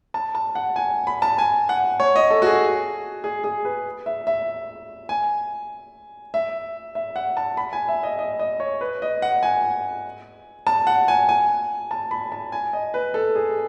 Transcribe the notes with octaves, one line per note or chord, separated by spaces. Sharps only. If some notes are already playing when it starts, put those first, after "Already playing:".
A5
A5
F#5
G#5
B5
A5
G#5
F#5
C#5
D#5
A4
F#4
G#4
G#4
G#4
B4
E5
E5
G#5
E5
E5
F#5
A5
B5
G#5
E5
D#5
D#5
D#5
C#5
B4
D#5
F#5
G#5
A5
F#5
G#5
G#5
A5
B5
A5
G#5
D#5
B4
A4
G#4